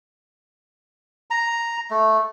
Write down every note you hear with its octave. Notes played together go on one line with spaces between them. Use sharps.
A#5
A3